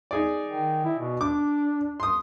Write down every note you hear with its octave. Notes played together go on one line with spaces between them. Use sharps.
D#4 G#4 D5
D#3
E4
B2
D4 D6
C6 D#6